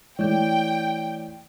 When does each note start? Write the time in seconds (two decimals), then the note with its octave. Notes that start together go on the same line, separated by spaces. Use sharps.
0.19 E3 A3 C#5 D5 G5 G6